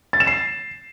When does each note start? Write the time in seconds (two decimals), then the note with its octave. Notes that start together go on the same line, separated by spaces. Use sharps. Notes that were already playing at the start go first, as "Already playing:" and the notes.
0.13 A6
0.20 E7
0.27 C7